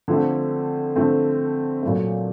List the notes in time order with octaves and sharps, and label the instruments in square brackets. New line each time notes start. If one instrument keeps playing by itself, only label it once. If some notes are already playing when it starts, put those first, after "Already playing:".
[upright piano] D3 F3 A3 C4
D3 F3 A3 C4
A#2 F#3 A3